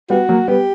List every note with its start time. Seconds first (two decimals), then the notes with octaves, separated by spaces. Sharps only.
0.10 G3 B3 F#4
0.29 F#3 A#3
0.48 G3 B3 G4